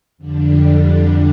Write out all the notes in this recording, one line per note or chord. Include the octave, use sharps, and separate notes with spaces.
F2 D3 G3 D4